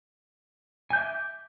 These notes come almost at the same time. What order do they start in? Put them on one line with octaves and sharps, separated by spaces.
G#5 G6 E5 D6